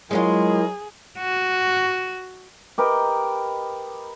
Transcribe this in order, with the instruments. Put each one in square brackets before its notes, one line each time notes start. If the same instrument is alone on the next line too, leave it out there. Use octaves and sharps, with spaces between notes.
[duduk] F#3 [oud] G#3 C#4 F4 [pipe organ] E4 A#4 D#5 [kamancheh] G#4
[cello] F#4
[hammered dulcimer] G4 A#4 B4 D#5